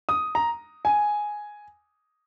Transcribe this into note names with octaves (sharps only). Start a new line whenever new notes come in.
D#6
A#5
G#5